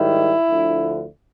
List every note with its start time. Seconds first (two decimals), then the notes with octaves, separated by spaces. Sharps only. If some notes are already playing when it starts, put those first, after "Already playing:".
Already playing: G#2 D#3 G3 E4
0.48 D2 D3 F3